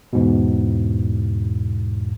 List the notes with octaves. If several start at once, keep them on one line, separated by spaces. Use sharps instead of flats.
E2 G#2 B2